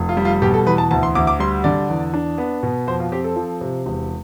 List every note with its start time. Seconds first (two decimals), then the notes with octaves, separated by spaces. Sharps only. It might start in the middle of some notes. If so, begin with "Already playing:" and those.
Already playing: F1
0.09 F4
0.17 G3
0.25 F4
0.42 B2 G4
0.54 A4
0.66 E2 B4
0.78 A5
0.91 D2 A5
1.03 C6
1.15 D2 D6
1.27 D6
1.39 G3 C6
1.64 D3 D5
1.89 E2
2.14 D4
2.38 B3
2.63 B2
2.87 F2 C5
3.00 F4
3.12 C4 G4
3.24 A4
3.36 F3
3.61 C3
3.86 E1